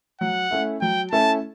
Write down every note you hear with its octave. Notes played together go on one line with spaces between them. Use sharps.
F#3 F#5
A3 C#4 E4
F#3 G5
A3 C#4 E4 A5